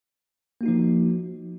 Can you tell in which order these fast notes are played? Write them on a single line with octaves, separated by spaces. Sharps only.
A#3 F#4 D#4 F3